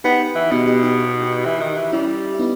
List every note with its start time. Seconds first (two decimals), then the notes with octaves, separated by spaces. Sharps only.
0.04 B3 D#4 G4
0.35 E3
0.51 B2 B3 D#4
0.67 D#4 G4
0.83 D#4 G4
1.22 D#4 G4
1.45 E3
1.61 D#3
1.77 E3
1.92 G3 C#4 E4
2.35 E4
2.39 B3 D#4